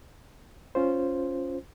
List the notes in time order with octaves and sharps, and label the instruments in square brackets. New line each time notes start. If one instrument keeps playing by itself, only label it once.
[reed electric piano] C#4 F4 C5